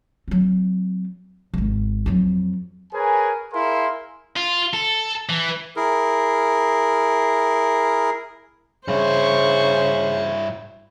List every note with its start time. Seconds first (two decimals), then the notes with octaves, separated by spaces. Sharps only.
0.28 F#3 C4
1.54 D1 G#1
2.06 F2 F#3
2.93 G#4 A#4 B4 C#5 G#5
3.53 E4 G#4 A#4 F5 C6
4.36 F4
4.73 A4
5.29 E3
5.76 E4 G#4 A#4
8.88 G2 C#3 E4 C5 C#6